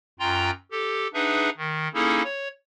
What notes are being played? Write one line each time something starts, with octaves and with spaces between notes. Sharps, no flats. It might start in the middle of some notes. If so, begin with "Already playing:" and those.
F#2 F4 G5 A#5 C6
G4 A4
D4 D#4 G#4 B4 E5 F#5
D#3
A#3 C#4 D#4 E4 G#4 A4
C#5